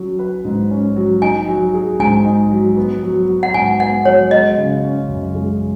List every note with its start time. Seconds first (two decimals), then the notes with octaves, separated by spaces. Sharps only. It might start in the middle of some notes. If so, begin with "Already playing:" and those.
Already playing: F#3 C#4
0.19 B4
0.45 G#2
0.70 C#4
0.96 F#3
1.22 D#4 G#5
1.48 F#3
1.74 G#4
1.99 G#2 G#5
2.25 D#4
2.51 F#3
2.77 B3
3.03 F#3
3.29 F#4
3.43 F#5
3.54 G#2 G#5
3.80 B3 F#5
4.05 F#3 C#5
4.31 G#3 D#5
4.57 C#3
4.84 C#4
5.09 F#2
5.35 G#3